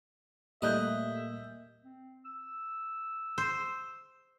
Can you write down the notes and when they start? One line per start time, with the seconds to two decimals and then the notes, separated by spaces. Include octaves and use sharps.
0.62 A#2 G3 A3 D#5 E5 F#6 G6
1.83 C4
2.25 E6
3.38 C5